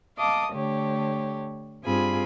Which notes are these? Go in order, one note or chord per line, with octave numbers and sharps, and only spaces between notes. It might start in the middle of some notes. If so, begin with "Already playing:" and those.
D#5 F5 A5 D6 D#6
D3 A3 G4 C#5
G2 C4 F4 G#4 G#5 B5